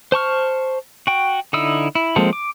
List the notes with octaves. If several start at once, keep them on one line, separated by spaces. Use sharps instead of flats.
C5 A5 C#6 F6
F#4 G5
D3 D#4 E4 D#6 E6
E4
F3 G#3 A#3 C4 A4
D6